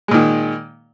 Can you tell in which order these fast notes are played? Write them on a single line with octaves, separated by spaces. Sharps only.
G#3 A#2 D#3